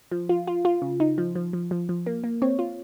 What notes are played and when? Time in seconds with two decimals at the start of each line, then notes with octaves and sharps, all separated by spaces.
0.12 F3
0.29 F4
0.47 F4
0.65 F4
0.82 C#3
1.00 D#4
1.18 F3
1.35 F3
1.53 F3
1.71 F3
1.89 F3
2.06 A#3
2.24 A#3
2.42 C4 C#5
2.59 F4